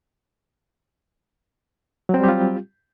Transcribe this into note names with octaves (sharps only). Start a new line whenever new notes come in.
F#3 G3 C4 F4 G4